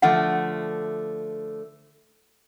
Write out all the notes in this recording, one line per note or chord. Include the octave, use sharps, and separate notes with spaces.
D3 F3 A3 F#5